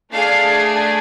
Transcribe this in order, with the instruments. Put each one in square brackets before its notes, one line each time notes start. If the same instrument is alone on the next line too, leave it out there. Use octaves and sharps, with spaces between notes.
[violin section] A3 D4 G#4 F5